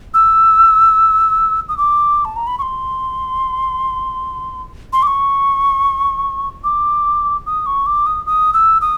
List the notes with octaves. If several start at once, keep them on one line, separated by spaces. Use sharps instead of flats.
E6
D#6
D6
A5
A#5
B5
C#6
C6
C6
D6
C#6
D6
D#6
C#6
D6
D#6
D#6
E6
D#6